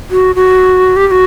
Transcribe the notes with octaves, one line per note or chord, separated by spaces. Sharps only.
F#4
F#4
G4
G4
F#4